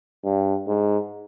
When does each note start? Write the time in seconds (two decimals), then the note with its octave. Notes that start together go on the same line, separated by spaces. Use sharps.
0.25 G2
0.68 G#2